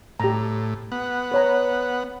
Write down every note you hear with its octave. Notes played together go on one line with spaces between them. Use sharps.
A2 G4 A#5
B3 F#5
B4 C#5 A#5